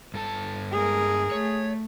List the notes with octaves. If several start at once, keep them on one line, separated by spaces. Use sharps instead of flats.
G2 A4 A5
G#3 G#4 A#4
A3 C#5